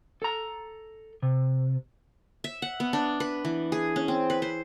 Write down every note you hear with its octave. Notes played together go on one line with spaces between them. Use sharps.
A4 A#5
C3
E5
F#5
B3
D4
B4
E3
G#4
C#4
C4
B4
C5